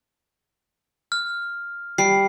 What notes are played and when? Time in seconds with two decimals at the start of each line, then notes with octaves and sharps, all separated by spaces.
1.12 F6
1.98 G3 C7